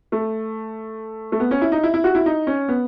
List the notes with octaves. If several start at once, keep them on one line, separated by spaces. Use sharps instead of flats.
A3
A3
B3
C#4
E4
D#4
E4
E4
F#4
E4
D#4
C#4
B3